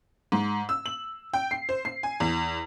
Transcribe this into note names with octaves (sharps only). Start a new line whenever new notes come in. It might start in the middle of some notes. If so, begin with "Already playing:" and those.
G#2
E6
F#7
G5
C7
C5
C7
G#5
E2